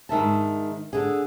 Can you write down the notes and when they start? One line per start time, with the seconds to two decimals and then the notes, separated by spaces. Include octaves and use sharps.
0.09 G#2 D#3 E5 A5
0.93 D3 G#4